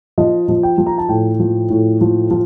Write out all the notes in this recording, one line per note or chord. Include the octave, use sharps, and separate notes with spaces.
F3 D#5
F3
G5
F3
A#5
A5
A2 G5
F3
A2
F3
F3